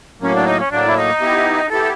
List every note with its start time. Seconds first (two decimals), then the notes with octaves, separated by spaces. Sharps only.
0.20 A2 F#3 A#3 C#4
0.33 D4
0.46 D#4
0.59 C#4
0.70 A2 F#3 A#3 D4
0.86 E4
0.96 D#4
1.20 B3 E4 G4
1.70 B3 E4 G4 A4